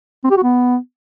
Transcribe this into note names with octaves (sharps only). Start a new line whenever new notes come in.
C4
G4
F#4
B3